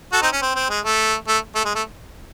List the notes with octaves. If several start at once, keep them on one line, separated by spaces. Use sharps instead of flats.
F#4 A4
C4 D#4
C#4
C4
C4
G#3
A3
A3
A3
G#3
A3